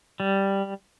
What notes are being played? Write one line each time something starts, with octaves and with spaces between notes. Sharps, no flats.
G3